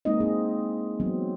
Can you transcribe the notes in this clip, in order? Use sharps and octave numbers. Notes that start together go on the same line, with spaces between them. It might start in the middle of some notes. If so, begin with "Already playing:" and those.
G#3 A#3 C4 D#4 E4 D#5
C4 D#4 E4 G#4
E3 F#3 B3 C4